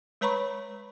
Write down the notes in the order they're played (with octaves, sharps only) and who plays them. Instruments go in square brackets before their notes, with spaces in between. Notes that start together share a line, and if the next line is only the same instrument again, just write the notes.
[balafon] G#3 B4 C#5 A#5 B5 C#6